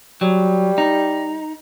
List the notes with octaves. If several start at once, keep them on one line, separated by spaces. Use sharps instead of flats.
F#3 G3
D#4